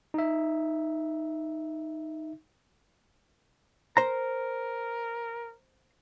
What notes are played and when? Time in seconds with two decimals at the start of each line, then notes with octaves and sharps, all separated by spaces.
0.14 D#4 E5
3.97 A#4 C5 A#5